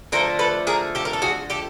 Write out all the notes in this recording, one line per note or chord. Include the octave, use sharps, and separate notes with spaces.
D3 F3 A3 A#4 C5
A4 B4
G#4 A#4
G4 A4
A#4
A4
F#4 G#4
G4 A4